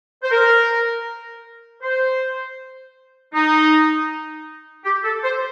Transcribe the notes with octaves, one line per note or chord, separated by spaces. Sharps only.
C5
A#4
C5
D#4
G4
A4
C5